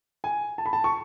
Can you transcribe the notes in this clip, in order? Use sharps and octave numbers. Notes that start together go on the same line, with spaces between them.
G#5
A5
B5
A5
C#6